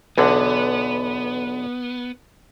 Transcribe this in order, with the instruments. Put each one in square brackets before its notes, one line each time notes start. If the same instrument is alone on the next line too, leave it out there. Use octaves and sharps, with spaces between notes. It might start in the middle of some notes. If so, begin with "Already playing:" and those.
[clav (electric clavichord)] B1 E2 D3 [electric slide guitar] B3